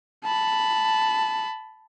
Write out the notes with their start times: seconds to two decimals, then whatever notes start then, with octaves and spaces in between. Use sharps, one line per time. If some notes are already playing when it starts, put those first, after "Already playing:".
0.24 A5 B5